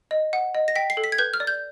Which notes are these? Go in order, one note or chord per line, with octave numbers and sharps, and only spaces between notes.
D#5
F#5
D#5
A#6
G5 B6
C7
A4
B6
G#6
B4 G6
F6
D5
G6